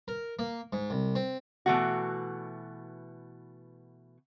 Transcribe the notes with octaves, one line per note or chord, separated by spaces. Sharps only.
A#4
A#3
G#2
C2
C4
B2 E3 A3 F#4